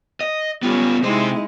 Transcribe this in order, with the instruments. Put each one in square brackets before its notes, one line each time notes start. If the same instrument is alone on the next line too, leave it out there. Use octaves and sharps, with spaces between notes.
[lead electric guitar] D#5
[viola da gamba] G3 C#4 [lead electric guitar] B3 F4
[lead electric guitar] C3 C5 [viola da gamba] G#3 D#4 E4